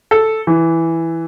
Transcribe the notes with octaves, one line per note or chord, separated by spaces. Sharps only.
A4
E3